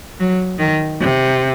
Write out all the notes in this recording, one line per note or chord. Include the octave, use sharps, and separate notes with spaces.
F#3
D#3
C3